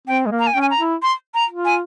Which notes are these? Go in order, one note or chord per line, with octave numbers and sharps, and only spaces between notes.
C4 G5
G#3
A#3
A#5
G#5
C#4 G5
G#5
A#5
E4
C6
A#5
F4
G#5